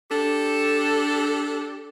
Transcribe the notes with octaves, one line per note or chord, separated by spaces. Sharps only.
D4 G4 A4